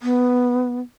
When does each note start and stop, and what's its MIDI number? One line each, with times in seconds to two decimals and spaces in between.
0.02 0.80 59